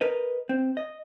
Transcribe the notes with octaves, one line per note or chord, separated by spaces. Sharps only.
A#4 B4 D#5
C4
D#5